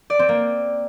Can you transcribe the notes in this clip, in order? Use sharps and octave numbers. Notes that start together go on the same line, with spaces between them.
D5
C4
A#3